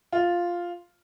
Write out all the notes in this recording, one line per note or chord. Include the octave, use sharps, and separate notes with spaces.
F4